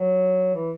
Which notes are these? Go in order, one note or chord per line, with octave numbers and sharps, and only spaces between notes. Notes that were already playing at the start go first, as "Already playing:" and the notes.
Already playing: F#3
E3